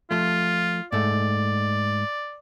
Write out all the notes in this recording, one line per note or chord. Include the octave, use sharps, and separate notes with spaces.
F3 A3 F4
G#2 A3 D5